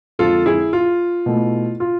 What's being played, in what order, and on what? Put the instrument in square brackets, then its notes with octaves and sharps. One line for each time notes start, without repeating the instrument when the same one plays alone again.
[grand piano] F2 D3 G#3 C4 [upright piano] F4 A4
[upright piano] E4 G#4
F4
[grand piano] B2 A3 E4
[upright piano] F4